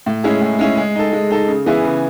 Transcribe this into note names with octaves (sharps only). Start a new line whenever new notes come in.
A2
G#3 C#4 E4 G#4
A2
G#3 C#4 E4 G#4
G#3
D#4 A4
G#3
D#4 A4
C#3
E3 B3 E4 G#4
C#3